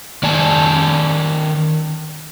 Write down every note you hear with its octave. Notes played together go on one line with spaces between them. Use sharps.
D#3 D5 G#5 A5